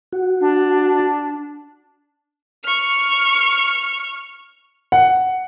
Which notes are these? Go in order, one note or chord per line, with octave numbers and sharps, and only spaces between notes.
F#4
D4
C#6 F6
F#5